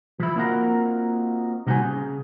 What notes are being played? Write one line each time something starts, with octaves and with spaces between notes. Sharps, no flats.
F3 E4
A#3 C4 D#4 F4 F#4 A#4
C3 G3 D#4 F#4 C5 G#5
C#3